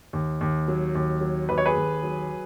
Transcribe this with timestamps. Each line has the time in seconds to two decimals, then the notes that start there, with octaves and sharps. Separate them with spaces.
0.13 D#2
0.41 D#2
0.68 F#3
0.95 D#2
1.21 F#3
1.49 D#2 B4
1.58 C#5
1.66 G#4 B4
1.76 D#2
2.04 F#3